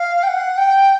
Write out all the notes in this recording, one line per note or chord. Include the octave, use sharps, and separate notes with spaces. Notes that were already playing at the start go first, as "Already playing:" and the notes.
Already playing: F5
G5
F#5
G5